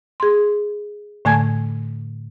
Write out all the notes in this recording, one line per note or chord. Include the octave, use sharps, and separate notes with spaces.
G#4 C6
A2 D3 A3 G#5 A5 G#6